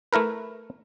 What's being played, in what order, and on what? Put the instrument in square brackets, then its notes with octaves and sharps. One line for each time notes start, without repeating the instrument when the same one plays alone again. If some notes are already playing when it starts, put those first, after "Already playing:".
[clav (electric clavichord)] A3 E4 A#4 B4